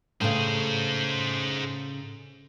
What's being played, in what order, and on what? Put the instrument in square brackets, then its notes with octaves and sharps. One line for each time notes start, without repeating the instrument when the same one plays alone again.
[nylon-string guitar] A2 C#3 [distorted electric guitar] G#4 C5